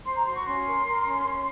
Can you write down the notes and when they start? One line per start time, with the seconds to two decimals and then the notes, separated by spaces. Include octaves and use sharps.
0.05 C5 C6
0.15 A#5
0.25 F#4 C6
0.35 C#6
0.45 C#4 C6
0.65 A#4
0.85 A#4
1.05 C#4
1.26 C#4